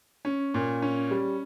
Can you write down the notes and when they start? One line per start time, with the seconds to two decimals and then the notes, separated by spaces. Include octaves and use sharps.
0.25 C#4
0.54 A#2
0.82 C#4
1.11 G3